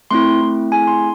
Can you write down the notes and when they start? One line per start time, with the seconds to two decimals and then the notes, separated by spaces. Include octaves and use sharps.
0.11 A3 C4 E4 C6
0.41 A3 C4 E4
0.72 A3 C4 E4 G#4 G#5
0.87 C6